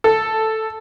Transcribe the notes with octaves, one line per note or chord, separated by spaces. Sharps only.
A4